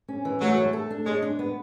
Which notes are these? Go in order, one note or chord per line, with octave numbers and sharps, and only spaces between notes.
C#4
E3
F#3 A3
A3
A4
D4
G#3 C#5
D4
B3